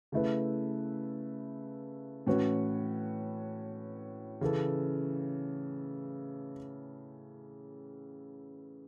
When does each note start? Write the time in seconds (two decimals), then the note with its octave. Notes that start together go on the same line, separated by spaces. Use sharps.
0.12 C#3 A3 E4 B4
2.27 A2 E3 C#4 F#4 B4
4.41 C#3 E3 C#4 A4